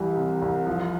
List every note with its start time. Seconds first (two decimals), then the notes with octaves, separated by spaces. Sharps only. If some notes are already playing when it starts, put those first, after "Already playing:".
Already playing: C2 E3 G3
0.17 C3
0.42 C2
0.67 F3